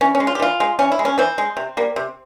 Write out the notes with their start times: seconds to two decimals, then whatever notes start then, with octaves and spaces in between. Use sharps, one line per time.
0.01 E3 C#4
0.15 C#4
0.20 G#3
0.27 F4
0.35 G4
0.40 E3 F4
0.60 G#3
0.79 E3 C#4
0.92 E4
0.99 G#3
1.05 C#4
1.18 E3 C4
1.38 G#3
1.57 C3
1.77 G3 A#3
1.96 C3